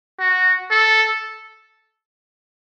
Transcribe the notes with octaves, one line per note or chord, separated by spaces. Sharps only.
F#4
A4